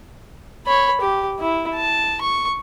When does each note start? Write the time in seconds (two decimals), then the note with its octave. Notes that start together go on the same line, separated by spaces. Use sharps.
0.66 C#5 B5
1.01 G4
1.39 E4
1.75 A5
2.21 C#6